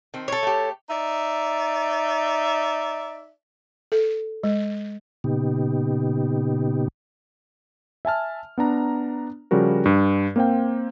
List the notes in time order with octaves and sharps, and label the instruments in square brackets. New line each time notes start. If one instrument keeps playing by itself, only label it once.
[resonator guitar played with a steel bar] D#3 C4
[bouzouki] A4 C#5
[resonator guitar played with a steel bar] A3 G4
[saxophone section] D#4 D5 E5
[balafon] A4
G#3
[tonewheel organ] A#2 C#3 B3 D#4 G4
[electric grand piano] E5 G#5 A5 F6
B3 D4 A#5
C#3 F3 G3 F#4 A#4
G2
A#3 C4 C5 F5 G5